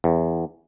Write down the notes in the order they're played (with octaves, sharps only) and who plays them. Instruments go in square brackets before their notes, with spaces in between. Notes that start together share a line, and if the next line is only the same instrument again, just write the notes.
[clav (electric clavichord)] E2